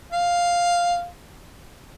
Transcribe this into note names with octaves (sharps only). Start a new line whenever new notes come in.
F5